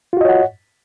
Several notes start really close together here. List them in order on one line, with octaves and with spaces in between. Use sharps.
F4 F#4 D#5 C#5 F#5